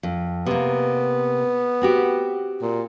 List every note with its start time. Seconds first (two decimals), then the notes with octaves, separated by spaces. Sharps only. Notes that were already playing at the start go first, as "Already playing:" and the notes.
0.03 F2
0.46 C3 A#3 B3
1.82 C4 F#4 G4
2.62 A#2